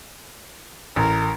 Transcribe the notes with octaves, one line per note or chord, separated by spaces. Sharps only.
A1 A#4